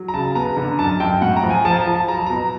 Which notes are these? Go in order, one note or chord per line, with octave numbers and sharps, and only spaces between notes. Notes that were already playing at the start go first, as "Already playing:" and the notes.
Already playing: F#3
A#5
C#3 A5
B3 A#5
D3
F#2 A5
F#2 G5
A2 F#5
A#5
F3
G#5
F3 A5
A#5
F3
A5
F#3 A#5
B2 A#5